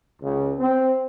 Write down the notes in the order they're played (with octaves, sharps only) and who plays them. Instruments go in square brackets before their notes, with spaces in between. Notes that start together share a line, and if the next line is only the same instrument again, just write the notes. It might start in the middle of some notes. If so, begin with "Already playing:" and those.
[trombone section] C#2
C4